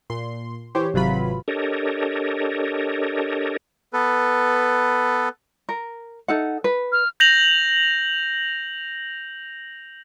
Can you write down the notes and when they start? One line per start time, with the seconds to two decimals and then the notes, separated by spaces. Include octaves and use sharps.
0.10 A#2 C6
0.75 E3 G4 C5 C#5
0.94 G#1 C3 F#3 F4 B4 B5
1.48 D4 G4 A4 A#4 C#5 D#5
3.93 B3 A4 B4
5.69 A#4
6.28 D#4 A4 F#5
6.64 B4
6.92 F6
7.20 G6 A#6 F7 F#7